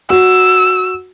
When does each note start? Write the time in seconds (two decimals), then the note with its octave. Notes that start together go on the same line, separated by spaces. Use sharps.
0.10 F#4 E6